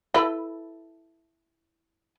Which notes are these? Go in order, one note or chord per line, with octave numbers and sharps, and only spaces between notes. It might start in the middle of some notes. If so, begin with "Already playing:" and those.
E4 A4 B4